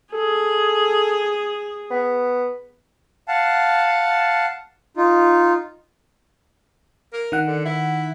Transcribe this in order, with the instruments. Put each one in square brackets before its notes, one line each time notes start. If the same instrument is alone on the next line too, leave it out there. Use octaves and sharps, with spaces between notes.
[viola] G#4 [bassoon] A4
[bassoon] B3
[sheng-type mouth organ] F5 F#5 A5
D#4 F4
[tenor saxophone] A#4
[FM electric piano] D#3 F#5
[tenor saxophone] D3
E4